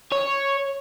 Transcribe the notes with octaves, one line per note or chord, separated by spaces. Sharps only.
C#5